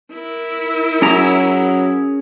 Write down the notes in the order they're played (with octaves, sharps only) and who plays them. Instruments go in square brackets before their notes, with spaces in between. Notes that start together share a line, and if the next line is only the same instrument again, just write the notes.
[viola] E4 A#4
[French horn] F#3 [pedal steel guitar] C#4 G#4 A#5